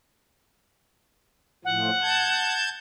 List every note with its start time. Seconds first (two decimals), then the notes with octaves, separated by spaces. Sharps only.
1.65 A2 F3 F#5
2.01 A5 G6 G#6